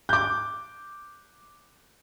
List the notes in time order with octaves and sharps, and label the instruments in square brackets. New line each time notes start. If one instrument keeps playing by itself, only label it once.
[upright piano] D6 G6